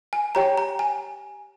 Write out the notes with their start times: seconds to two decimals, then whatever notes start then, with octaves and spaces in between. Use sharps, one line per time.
0.13 G#5
0.35 G4 C#5 G5 A#5
0.58 A#5
0.79 G#5